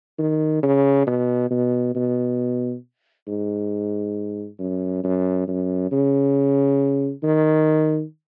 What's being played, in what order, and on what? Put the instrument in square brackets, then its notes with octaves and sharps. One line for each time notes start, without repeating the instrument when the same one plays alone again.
[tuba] D#3
C#3
B2
B2
B2
G#2
F#2
F#2
F#2
C#3
D#3